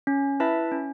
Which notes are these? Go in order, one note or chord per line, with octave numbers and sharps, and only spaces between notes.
C#4
E4 B4 E5 A5
C#4